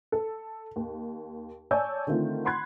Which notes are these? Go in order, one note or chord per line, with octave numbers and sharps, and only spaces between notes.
A4
D#2
C#5 D5 G#5 A5 E6 G6
D3 D#3 A3 C4 F4
F#5 B5 C6 F#6 G#6